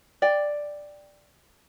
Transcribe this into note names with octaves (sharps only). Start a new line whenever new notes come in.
D5 G5